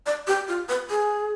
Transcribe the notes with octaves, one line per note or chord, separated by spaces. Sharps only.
D5
G4
F4
B4
G#4